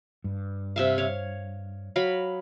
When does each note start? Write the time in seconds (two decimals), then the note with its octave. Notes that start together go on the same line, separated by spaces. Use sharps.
0.24 G2
0.76 C3 E5 F5
0.98 C#5 F5
1.96 F#3 F5 B5